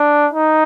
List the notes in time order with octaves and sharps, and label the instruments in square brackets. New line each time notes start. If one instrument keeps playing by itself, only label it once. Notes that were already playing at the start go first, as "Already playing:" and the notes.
Already playing: [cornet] D4
D#4